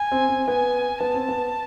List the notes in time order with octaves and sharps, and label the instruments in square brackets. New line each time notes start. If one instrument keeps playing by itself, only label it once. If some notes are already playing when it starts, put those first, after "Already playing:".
Already playing: [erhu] G#5
[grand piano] C4
C4
[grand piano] B3 [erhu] G#5
[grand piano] B3 [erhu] A5
[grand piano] C4
B3